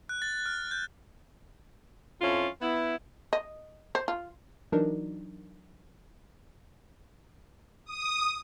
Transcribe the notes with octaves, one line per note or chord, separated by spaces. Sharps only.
F#6
A6
F6
G6
F2 C#4 E4 F4
B3 E4
D#5
C5
F4
E3 F#3 D4 D#4 A#4
D#6